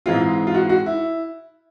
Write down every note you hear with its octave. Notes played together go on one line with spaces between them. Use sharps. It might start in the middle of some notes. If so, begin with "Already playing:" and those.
G#2 E3 G#3 C4 F4
F4
F#4
F#4
E4